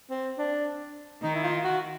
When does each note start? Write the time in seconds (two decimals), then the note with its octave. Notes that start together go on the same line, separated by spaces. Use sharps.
0.10 C4
0.38 D4
1.23 D#3 D#4
1.35 E4
1.44 F4
1.64 F#4